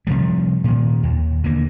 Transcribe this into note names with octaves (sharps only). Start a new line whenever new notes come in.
C3 F3 G3
A#2 D#3
D#2
D3 A#3